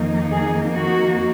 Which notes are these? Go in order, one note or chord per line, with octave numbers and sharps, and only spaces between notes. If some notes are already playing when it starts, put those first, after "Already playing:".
Already playing: F2 D#3 A#3 D#4
G#4
F#4